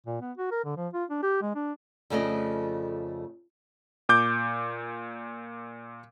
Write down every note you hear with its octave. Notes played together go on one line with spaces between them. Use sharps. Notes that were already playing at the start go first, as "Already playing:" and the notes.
A#2
B3
F#4
A#4
D3
F3
F4
D4
G4
G#3
D4
F2 C#3 F3 A3 D5 D#5
A#2 D6 G6